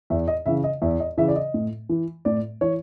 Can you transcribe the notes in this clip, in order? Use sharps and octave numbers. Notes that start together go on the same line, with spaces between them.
E2 E5
D#5
C#3 E3 E5
D#5
E2 E5
D#5
C#3 E3 E5
D5
D#5
A2
E3
A2 D5
E3 C#5